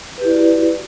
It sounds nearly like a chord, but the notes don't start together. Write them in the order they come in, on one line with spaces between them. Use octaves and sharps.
B4 G4 E4 D5 F#4